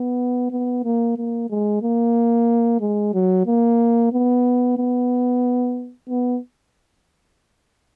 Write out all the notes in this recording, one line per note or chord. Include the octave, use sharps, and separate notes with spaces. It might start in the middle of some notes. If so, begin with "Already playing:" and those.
Already playing: B3
B3
A#3
A#3
G#3
A#3
G#3
F#3
A#3
B3
B3
B3